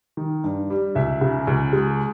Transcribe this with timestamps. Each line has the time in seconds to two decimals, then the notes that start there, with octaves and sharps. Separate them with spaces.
0.17 D#3
0.44 G2
0.70 G3
0.95 C#2 E5
1.21 C#3
1.47 C#2
1.73 G#3